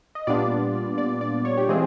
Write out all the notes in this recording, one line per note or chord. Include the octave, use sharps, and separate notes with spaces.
D#5
A#2 G3 B3 D4 F4 D5
D5
D5
C#5
G4
E3 G#3 C4 F4 G#4